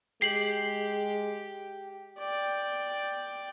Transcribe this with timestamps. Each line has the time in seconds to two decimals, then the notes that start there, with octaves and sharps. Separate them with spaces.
0.22 G#3 G4 C7 F#7
2.19 D5 G5